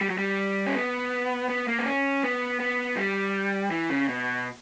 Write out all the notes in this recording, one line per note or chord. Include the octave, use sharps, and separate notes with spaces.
G3
F#3
G3
C#4
B3
B3
A#3
B3
C#4
B3
B3
G3
E3
C#3
B2